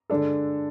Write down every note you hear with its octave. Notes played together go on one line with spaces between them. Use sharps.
D3 G#3 D4 A4